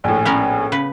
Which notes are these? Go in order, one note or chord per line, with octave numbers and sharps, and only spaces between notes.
A#1 A2 G#5
B3 C#4 A#4
C#3 B4